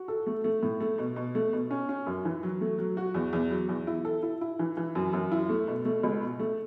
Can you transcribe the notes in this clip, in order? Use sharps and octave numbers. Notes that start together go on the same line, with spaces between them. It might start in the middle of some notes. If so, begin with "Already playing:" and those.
Already playing: F#4
A4
A3
A3
A2
A3
B2
B2
A3
B2
C#4
C#4
F#2
E3
F#3
A3
F#3
F#4
E2
E2
F#3
E2
E4
A4
E4
E4
E3
E3
F#2
F#2
E4
A3
B2
A3
C#2
B2
A3